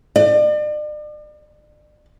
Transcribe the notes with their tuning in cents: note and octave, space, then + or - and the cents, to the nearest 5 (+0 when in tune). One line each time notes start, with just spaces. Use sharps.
D5 +40